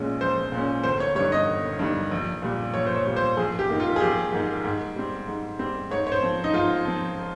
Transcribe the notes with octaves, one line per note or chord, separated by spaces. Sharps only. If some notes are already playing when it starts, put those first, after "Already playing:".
Already playing: A#1 A#2 G#3 C#4
A#1 C5
A#2 G#3 C#4
G1 C5
C#5
G2 D#3 G3 C#5
D#5
G1
G2 D#3 G3
A#1
A#2 G3
A#1 C#5
C5
C#5
A#2 G3
C5
A#1 G#4
G4
G#2 D#3 A#3
F4
G#4
A#1 G4
G#2 D#3 A#3
G#2
G3 C4
G#2
G3 C4
G#2 C#5
C#5
C5
F3 C4
D#4
G#2 F4
F3 C4